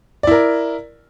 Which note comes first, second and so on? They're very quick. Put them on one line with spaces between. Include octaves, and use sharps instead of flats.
D5 E4 A#4